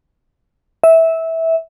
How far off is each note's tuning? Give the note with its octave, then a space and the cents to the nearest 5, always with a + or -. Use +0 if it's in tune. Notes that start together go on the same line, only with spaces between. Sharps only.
E5 -15